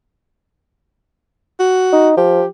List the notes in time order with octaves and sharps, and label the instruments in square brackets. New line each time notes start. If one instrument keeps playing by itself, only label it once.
[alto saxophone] F#4
[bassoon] D#4
[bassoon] F3 [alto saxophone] G4